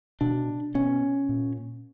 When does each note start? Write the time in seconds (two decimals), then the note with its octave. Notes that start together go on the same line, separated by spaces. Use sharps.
0.21 B2 D4
0.75 B2 C#4
1.29 A#2